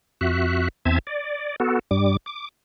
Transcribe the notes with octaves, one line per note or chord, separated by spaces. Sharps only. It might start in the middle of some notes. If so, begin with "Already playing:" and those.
F2 F#4 E5 F#6
E2 C4 E5 A5 G#6
D5
B3 F#4 A4
G2 G3 D6
D6